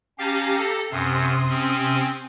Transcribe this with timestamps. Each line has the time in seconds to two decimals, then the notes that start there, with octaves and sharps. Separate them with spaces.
0.18 C#4 G4 F5 A5 A#5
0.57 A4
0.92 F#2 C3 C6 D#6
1.49 C4 C#4